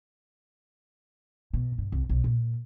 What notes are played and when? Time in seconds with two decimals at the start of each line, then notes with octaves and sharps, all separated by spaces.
1.53 B2
1.78 G2
1.92 C2
2.09 B1
2.24 A#2